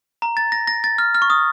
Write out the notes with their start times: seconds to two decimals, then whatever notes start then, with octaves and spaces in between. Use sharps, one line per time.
0.22 A#5
0.37 A6
0.52 A#6
0.67 A#6
0.84 A6
0.98 F6
1.15 F6
1.22 C#6
1.30 D#6